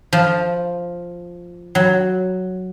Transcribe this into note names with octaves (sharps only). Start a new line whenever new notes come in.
F3
F#3